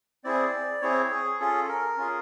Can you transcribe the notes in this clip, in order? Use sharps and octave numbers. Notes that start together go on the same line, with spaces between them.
C4 E4 G#4 D5
C4 E4 G#4 C#5
G#4
C#4 F4 G#4 A4
A#4
C#4 F4 G#4